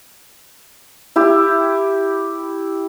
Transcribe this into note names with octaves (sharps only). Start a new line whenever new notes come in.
E4 G4